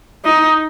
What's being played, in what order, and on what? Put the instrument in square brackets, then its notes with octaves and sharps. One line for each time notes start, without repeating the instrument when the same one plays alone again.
[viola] D#4